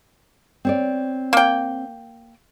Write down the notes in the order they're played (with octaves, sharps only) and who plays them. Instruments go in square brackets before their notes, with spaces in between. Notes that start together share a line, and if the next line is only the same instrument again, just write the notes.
[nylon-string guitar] C4 C#5 D5
[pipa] A#3 G5